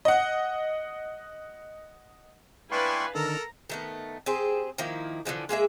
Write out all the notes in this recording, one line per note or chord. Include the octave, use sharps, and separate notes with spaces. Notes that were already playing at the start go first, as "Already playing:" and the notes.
D#5 F#5
D4 E4 B4 F5 G5 G#5 C6 C#6
D3 D#3 A4 A#4 A#5
D#3 A3 B3
C4 G4 G#4 C5
D#3 F3 A#3 E4
D3 E3 F3 G#3
G#3 A#3 G#4 E5